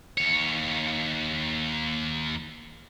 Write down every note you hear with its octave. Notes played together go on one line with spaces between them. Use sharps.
D#2 C#5